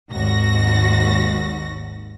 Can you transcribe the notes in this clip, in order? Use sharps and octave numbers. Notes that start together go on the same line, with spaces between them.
G#1 D#2 G#2 F#4 A#6